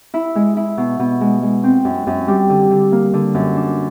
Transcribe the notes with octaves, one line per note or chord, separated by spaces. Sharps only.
E4
G#3
E4
B2
B2
G#3
G#3
C4
F#2
F#2
G3
D3
D3
A#3
D3
F#2
D4